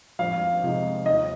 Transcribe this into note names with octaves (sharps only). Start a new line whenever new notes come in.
F2 F5
C3 F3 G#3 D#4
D#2 D#5